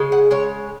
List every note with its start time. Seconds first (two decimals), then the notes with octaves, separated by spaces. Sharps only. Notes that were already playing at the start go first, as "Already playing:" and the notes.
Already playing: C#3 G#3
0.12 F#5
0.31 C#3 G#3 C#5